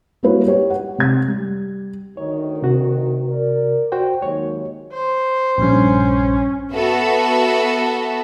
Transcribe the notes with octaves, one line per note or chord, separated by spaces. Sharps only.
G3 A#3 E4 F#4 B4 C#5
G4 C#5
F#5
C3 G#6
G3
D2 D#3 C#5
C3 F#4
A#4 D5
F#4 C5 G5
D#2 F#3 G#3 C#5
C5
A#1 G2 C#4
B3 F#4 A4 E5